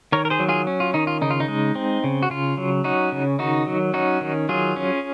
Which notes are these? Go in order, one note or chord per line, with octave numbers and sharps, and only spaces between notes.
D#3 A#4 C#5
A#4
G#4 C5
F#3
F4 G#4
C#4
F4
D#3 D#4
F4
C#3 D#4
F4
D#4
G#3
C4
C#3
F#4
C#3 F4
F#3
C#4 D#4 F#4
C#3
D#3 D#4 F#4
F#3
C#4 D#4 F#4
D#3
F#3 F4 G#4
C#4